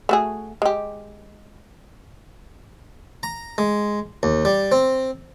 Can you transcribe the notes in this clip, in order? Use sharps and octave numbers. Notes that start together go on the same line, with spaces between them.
A3 F#4 G#4
G#3 G4
A#5
G#3
D#2
G3
C4